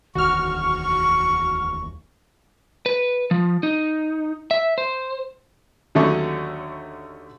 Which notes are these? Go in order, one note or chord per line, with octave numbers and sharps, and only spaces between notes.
E1 D2 D#3 F#4 C#6 F6
B4
F3
D#4
E5
C5
D#2 D3 F#3 A3 C#4 C#6